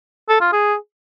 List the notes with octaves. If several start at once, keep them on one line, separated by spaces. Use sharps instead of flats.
A4
F4
G#4